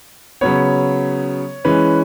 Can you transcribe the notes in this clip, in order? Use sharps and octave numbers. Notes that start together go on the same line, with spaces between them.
C#3 F#3 B3 C#5
E3 G#3 C#4 B4